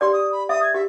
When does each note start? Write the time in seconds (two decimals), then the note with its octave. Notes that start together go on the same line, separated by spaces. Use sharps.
0.01 G4 D5 C6
0.13 D#6
0.32 B5
0.49 E5 D#6
0.63 G#6
0.74 G4 E5